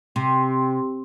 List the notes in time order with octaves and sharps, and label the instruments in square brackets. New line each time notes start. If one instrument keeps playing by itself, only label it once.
[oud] C3